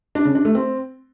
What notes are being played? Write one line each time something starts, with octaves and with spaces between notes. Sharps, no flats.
D4
C#3
D4
A3
C4